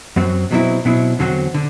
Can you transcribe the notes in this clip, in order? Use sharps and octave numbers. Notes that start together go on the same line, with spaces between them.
F#2 F#3 C4
B2 F#3 C4 E4
B2 F#3 C4 E4
E2 D3 F#3 C4 F#4
D3